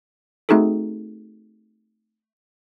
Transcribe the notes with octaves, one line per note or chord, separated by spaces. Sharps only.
A3 C4 D#4 F#4 G#4 A4